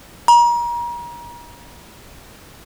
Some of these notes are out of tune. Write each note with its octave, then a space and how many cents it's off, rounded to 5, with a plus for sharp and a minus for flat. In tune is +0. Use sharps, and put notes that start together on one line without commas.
A#5 +35